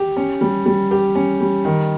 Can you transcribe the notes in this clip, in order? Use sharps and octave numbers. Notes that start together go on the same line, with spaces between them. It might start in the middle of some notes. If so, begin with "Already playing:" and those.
Already playing: G4
C#4
G3
G3
G4
C#4
G3
D#3